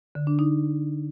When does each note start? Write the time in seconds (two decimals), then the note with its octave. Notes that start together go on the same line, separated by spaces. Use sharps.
0.15 D3
0.27 D4
0.39 D#4